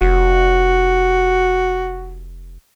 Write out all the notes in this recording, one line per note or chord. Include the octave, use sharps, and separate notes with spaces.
F1 F#4